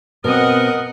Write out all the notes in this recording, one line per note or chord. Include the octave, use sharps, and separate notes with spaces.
B2 C4 A#4 B4 D#5 F#5